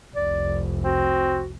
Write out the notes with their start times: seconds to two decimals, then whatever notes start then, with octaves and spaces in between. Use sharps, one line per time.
0.16 F1 C2 D5
0.85 C4 F#4